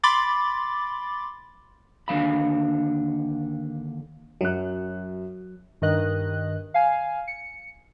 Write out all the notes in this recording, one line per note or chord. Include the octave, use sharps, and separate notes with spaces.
B5 C6 D6 A6
D#2 D3 F3 F5 B5
F#2 F#3 F#6
G2 D#3 D#5 F#6
F5 G#5
C#7